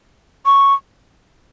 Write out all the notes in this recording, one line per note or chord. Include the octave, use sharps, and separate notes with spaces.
C#6